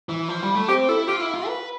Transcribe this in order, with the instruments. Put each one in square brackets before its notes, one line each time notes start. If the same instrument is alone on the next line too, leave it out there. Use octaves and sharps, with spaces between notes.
[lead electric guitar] E3
F3
G3
A3
[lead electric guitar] C4 [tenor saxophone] G4
[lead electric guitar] E4 [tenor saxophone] A4
[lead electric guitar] F4 [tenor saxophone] G4
[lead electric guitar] E4
F4
B4